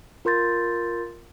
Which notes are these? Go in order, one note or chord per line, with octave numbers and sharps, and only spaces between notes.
F4 A#4 C6 G6 A6